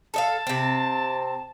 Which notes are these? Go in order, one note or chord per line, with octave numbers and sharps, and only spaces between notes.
A4 D#5 F5 A5
C3 C4